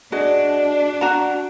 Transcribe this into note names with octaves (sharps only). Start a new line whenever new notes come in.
D4 F#4 G#4 D#5
F#4 A#5